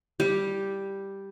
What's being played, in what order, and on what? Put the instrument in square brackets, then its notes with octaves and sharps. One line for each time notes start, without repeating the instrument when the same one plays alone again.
[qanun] G3 G4